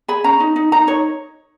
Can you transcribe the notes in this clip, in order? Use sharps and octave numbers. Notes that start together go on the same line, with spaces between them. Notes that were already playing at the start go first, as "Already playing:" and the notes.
G#4 B5
C#4 A#5
D#4
D#4
D#4 A#5
D#4 C#5